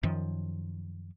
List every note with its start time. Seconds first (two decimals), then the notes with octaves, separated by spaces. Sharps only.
0.03 F#2 D#3 F3